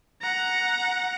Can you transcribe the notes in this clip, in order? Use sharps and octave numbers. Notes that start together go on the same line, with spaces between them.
F#5 A#5